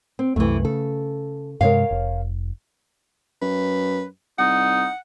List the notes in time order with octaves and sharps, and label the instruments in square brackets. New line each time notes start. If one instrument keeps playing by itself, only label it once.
[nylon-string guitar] C4
[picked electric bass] C2 F#2 [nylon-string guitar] E3 A3
[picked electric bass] C#3 [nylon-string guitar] A4
[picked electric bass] G2 C3 G#3 [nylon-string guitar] A#4 C#5 F5
[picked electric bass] F1
[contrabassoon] F#2 [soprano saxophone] B4
[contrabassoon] C2 [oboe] D#4 [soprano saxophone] F#5